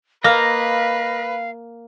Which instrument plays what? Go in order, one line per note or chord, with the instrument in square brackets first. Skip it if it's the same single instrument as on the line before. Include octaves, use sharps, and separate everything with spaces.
[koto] A#3 [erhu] B4 [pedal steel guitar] D#5 A#5 F6 [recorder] F5